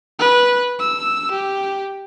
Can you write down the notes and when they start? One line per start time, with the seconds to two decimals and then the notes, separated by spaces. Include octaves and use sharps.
0.19 B4
0.79 E6
1.31 G4